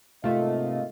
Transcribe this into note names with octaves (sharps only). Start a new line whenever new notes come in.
G#2 C3 A3 A#3 F4 D#5